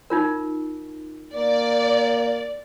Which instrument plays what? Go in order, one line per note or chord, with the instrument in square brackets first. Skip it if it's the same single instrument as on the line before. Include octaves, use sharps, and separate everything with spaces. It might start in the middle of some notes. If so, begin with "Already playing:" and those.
[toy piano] D#4 F4 A#4
[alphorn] A#3 [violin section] D5